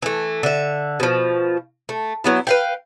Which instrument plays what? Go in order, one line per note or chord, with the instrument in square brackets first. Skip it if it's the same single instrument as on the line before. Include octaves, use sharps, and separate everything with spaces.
[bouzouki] E3 A3
D3 E5
B2 F3
A3
F#3 B3 E4
B4 F5 G5